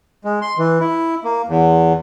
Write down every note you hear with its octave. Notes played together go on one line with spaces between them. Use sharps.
G#3
C6
E3
E4
A#3
E2